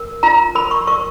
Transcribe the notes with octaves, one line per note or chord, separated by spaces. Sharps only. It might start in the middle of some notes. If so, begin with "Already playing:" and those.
Already playing: A#4
F4 A#5
A#4 B5
C#6
A#4 C#6